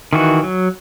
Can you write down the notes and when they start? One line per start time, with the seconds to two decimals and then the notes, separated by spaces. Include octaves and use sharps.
0.13 D#3 E3 F#4
0.43 F#3